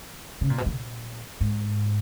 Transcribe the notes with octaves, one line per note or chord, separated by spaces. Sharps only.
C#3
A#2
B2
F3
A#2
G#2